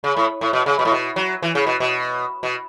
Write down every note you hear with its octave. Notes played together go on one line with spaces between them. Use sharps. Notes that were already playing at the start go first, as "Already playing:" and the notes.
C#3
A2
A2
B2
C#3
B2
A2
B2
F#3
E3
C#3
B2
B2
B2